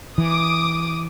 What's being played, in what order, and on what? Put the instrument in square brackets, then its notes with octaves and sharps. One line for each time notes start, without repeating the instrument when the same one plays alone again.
[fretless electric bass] E3 [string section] D6 D#6